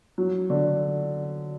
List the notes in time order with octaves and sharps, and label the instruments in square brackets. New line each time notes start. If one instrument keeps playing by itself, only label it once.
[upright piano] F#3
D3